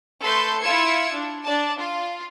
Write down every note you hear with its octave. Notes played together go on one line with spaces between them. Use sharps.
A3 A4 B4 C6 G6
E4 F4 E6 G#6 C#7
D4
D4 D5 A5
F4